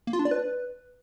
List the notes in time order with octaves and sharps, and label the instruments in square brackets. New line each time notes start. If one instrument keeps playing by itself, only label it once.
[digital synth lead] A#3
F4
D4
D5
B4